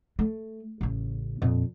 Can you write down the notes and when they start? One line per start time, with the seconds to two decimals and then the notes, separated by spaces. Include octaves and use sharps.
0.19 A3
0.81 A1 C#3
1.42 F2 A#2